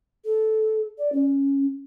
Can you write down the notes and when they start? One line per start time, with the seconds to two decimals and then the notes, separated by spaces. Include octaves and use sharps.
0.25 A4
0.98 D5
1.12 C#4